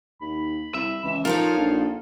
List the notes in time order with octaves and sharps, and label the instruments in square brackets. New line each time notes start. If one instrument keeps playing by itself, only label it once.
[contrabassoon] D#2 [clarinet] B5
[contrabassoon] C2 [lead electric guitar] E5
[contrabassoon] C#2 [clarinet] E3
[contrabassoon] F3 [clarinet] D#4 [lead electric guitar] F4 A4 [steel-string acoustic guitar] A#4 C#5 F5
[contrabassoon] A#1